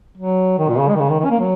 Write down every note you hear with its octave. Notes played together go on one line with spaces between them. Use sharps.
F#3
D#3
A#2
C#3
G#3
D#3
C#3
D#3
D#3
C#4
A#3
F#3